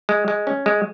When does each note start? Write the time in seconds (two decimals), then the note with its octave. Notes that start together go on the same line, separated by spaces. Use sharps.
0.09 G#3
0.28 G#3
0.47 C#4
0.66 G#3